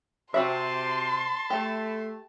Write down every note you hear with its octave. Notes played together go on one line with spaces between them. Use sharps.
C3 C4 F#4 E5 A5 C6
A3 G4